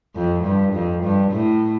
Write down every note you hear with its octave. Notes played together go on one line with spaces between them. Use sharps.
F2
G2
F2
G2
A2